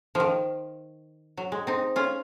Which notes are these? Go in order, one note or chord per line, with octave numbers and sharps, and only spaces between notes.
D#3 F3
F#3
G#3
C4 D#4
C#4 F4